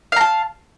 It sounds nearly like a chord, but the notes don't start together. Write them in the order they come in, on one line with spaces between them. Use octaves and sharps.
F5 A#5 A5